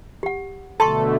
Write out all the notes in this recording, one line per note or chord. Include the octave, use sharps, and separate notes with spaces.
G4 F#5
B2 D3 A3 A4 A5 C6 C#6